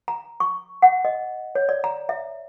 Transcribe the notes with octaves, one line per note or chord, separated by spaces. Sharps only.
A#5
C#6
F#5
D#5
C#5
D5
A#5
E5